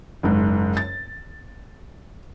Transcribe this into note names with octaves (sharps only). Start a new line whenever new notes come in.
F#1 G#2
A6